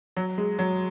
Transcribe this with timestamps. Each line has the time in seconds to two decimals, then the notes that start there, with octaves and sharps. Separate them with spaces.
0.17 F#3
0.38 G#3
0.59 F#3